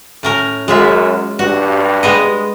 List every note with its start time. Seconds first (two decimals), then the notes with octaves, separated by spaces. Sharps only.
0.23 A2 C#4 A#4
0.68 F#2 G#3 F4 E5
1.39 G2 F#4
2.03 G#3 B3 D#5